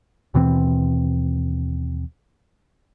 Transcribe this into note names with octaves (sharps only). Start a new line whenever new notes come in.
D#2 B2 E3 C4